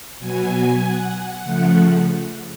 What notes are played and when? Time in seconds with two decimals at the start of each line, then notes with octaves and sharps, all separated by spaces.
0.19 B2 F#3 B3 G#5
0.81 F#5
1.12 F#5
1.43 C#3 F3 A3